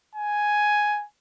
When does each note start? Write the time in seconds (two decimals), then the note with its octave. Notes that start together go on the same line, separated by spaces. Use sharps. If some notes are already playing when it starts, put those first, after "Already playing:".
0.15 G#5